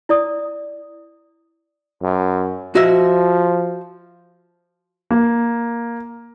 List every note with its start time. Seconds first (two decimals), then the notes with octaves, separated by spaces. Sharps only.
0.09 E4 D5 D#6
2.03 F#2
2.75 F3 F#4 D#5 E5
5.11 A#3